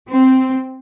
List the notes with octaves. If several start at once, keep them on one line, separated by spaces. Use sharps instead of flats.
C4